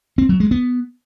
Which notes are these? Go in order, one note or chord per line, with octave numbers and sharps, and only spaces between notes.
C4
F#3
G#3
B3